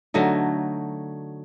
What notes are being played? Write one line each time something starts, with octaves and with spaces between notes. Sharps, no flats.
D3 F#3 A3 D#4